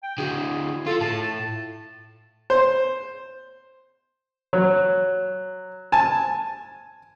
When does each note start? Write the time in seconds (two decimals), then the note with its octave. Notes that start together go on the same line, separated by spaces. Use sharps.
0.03 G5
0.18 D3 F#3 G#4
0.87 F3 F4 A4
1.01 A2 A5
2.50 C5
4.53 F#3
5.92 G#5 A5